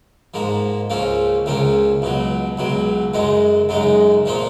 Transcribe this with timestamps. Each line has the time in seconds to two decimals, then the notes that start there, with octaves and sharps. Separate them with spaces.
0.34 G#2 F3 A#3
0.90 C#2 C#3 F3 A#3 C#4
1.46 C#2 C#3 F3 A#3 C#4
2.02 C#2 B2 F#3
2.57 C#2 B2 F#3
3.14 F#2 C#3 G#3 D#4
3.69 F#2 C#3 G#3 D#4
4.25 A#2 F3 A#3 F4